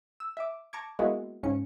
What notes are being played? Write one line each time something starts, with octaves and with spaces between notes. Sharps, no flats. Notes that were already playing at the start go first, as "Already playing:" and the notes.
E6
E5 D6
A5 A#5 C#6 D6 G#6
G#3 A#3 B3 E4 F#4
G#2 C#3 C#4 C#7